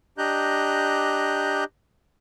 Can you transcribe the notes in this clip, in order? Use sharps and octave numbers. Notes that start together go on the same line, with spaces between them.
D4 G4 D#5 A#5 F#6 G6